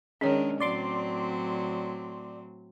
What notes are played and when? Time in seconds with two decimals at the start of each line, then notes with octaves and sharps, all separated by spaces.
0.21 D#3 G#3 C#4 D4 C#5
0.60 A2 F#3 C4 D5 C6 D6